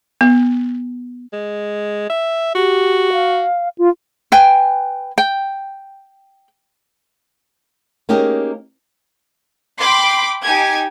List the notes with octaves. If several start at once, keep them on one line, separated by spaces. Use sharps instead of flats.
B3
G#3
E5
F#4 G4
F5
F4
B4 G5 G#5
G5
A#3 C#4 D#4 G4 G#4 A#4
G5 B5 C6 D6
D#4 G4 G#5 G#6